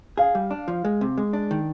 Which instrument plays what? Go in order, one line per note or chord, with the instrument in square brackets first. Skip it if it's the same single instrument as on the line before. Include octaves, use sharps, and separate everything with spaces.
[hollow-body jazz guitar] G#4 [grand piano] F5
[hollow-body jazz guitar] G3
D4
F3
G#3
C3
G#3
D4
D#3